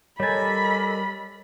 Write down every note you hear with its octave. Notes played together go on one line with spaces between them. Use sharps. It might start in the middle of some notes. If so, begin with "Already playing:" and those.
G3 A4 A#4 C#5 D#5 G#5 B5 A6